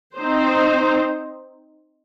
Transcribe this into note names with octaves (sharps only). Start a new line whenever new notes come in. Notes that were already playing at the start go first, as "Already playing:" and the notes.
C4 D#4 C5